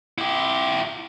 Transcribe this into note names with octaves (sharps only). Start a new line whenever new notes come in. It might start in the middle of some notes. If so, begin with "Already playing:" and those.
E4 G4